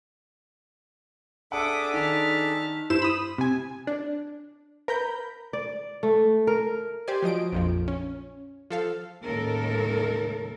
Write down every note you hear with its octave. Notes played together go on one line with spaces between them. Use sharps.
D4 G#4 A4 E5 F#5 D6 D#6
D#3 A5 F6 B6
G2 E4 C5 E7
B5 D#6
C3 G#5
D4
A#4 B4 A#5 B5 G6
D5
A3
A#4
G4 C5 D5 G#5
F3 F#3 D#5 D7
A#1 F2 F3
C#4
F3 A4 F5
D#2 A2 C#3 G#3 A4 A#4